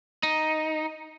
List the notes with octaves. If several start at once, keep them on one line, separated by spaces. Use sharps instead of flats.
D#4